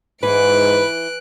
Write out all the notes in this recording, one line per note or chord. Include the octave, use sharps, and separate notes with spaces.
G#2 E3 B4 F#6 D7